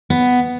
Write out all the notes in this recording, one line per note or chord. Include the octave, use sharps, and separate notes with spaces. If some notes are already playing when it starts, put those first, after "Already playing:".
B3